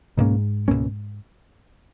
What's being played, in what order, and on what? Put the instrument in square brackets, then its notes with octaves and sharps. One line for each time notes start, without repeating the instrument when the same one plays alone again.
[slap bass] C#2 B2 A#3 C#4 [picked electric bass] G#2
[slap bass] C#2 B2 A#3 C#4